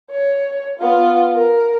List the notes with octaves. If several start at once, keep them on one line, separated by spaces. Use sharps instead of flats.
C#5
B3 F4
A#4